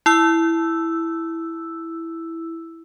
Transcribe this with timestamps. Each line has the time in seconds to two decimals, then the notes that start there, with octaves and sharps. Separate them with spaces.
0.06 E4 E6